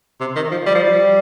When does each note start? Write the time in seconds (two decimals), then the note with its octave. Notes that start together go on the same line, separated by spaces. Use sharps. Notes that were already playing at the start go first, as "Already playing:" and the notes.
0.21 C3
0.36 D#3
0.51 F3
0.66 G3
0.75 F3
0.83 G3